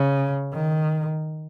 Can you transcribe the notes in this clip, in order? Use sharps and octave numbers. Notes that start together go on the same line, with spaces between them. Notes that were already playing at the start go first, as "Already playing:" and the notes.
Already playing: C#3
D#3